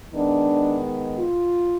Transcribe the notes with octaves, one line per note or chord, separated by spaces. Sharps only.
D#3 G#3 B3 D4
F4